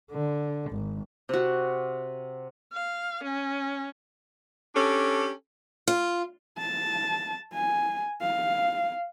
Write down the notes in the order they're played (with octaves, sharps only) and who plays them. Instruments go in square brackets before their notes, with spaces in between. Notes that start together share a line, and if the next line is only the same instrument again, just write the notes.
[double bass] D3
G#1
[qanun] C3 F#4
[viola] F5
C#4
[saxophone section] C#4 D4 G4 A4
[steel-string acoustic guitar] F4
[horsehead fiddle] A5
G#5
F5